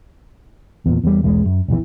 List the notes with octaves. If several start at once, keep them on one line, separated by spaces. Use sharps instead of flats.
E2 A#2
E2 G3
B1 E2 E3 G#3
F#2
E1 A#1 E2 E3